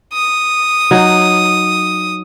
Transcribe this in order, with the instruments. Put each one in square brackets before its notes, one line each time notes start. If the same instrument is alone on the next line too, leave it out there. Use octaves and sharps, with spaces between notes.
[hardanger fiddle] D#6
[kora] F#3 D#4